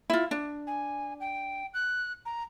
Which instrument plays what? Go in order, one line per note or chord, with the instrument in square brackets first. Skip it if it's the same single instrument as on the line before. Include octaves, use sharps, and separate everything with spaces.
[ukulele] E4 F4
D4
[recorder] G#5
G5
F#6
A#5